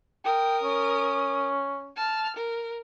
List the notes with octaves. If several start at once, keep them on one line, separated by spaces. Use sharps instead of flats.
A#4 G5 D#6
C#4
A5 F6
A#4